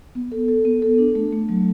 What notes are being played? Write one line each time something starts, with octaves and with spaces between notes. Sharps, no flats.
B3
A4
A4
B3
A4
D4
A3
A3
F#3